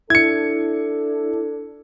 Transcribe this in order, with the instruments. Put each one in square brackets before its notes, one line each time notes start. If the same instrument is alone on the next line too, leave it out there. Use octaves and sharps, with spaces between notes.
[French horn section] D4 A4 [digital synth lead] E4 [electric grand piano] G#6 C#7